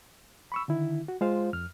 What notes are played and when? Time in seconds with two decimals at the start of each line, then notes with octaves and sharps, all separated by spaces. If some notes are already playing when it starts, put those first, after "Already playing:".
0.52 B5 C#6 E6
0.68 D3 D#3 E4
1.08 F#4
1.21 G#3 F4 C5 F5
1.53 F2 F6